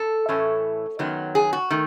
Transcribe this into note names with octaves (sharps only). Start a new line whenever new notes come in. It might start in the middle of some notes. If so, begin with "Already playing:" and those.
Already playing: A4
A2 E3 A3 C#4
F#2 D#3 F#3 B3
G#4
F#4
D#3 A3